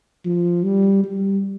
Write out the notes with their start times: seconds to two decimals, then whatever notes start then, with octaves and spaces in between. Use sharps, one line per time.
0.25 F3
0.64 G3
1.03 G3